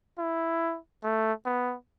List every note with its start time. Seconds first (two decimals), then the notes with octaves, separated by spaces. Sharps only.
0.18 E4
1.03 A3
1.45 B3